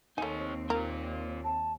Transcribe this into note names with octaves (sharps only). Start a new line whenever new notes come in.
D#2 A3 C4 D#4 C#5 G#5
A#3 F4 A#4
A5